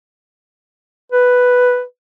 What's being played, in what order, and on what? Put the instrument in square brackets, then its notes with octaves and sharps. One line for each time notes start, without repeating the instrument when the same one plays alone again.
[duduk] B4